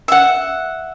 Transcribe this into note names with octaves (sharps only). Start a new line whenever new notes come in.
E5 F#5